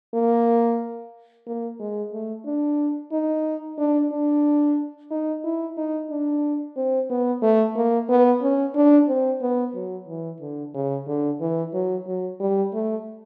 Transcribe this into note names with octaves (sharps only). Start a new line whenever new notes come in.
A#3
A#3
G#3
A3
D4
D#4
D4
D4
D#4
E4
D#4
D4
C4
B3
A3
A#3
B3
C#4
D4
C4
B3
F#3
E3
D3
C#3
D3
E3
F#3
F#3
G3
A3